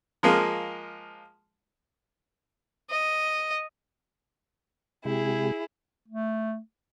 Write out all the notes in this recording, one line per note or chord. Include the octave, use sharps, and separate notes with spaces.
F3 G#3 A#3
D#5
C3 G#3 E4 G4 G#4
A3